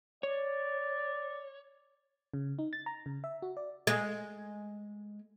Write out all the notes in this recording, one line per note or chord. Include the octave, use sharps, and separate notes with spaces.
C#5 D5
C#3
D#4
A6
A#5
C#3
E5
F#4
D5
G#3